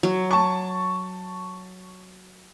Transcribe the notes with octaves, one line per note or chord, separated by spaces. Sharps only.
F#3
A5 C#6